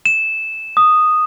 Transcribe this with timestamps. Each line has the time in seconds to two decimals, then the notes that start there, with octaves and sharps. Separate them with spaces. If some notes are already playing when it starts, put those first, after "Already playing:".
0.05 E7
0.77 D#6